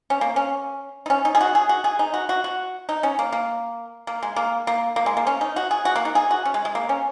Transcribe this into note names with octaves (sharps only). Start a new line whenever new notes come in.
C#4
A#3
C#4
D#4
C#4
D#4
G#4
F#4
G#4
F#4
G#4
D#4
F#4
F#4
F#4
D#4
C#4
A#3
A#3
A#3
G#3
A#3
A#3
A#3
G#3
A#3
C#4
D#4
F#4
G#4
F#4
A#3
D#4
G#4
F#4
C#4
G#3
G#3
A#3
C#4